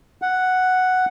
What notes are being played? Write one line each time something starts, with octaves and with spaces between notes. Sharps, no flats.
F#5